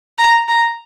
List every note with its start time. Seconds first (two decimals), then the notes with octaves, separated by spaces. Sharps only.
0.18 A#5
0.48 A#5